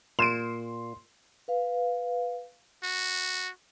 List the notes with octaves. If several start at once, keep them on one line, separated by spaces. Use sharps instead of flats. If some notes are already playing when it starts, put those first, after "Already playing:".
A#2 C6 D7 E7
B4 F5
F#4